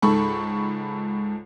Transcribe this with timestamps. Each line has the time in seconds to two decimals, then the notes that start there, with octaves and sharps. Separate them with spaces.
0.02 C#2 G#2 A4 B5 C#6